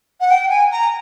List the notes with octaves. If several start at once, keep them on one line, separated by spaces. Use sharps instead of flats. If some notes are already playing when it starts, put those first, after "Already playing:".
F#5
G5
G#5
A#5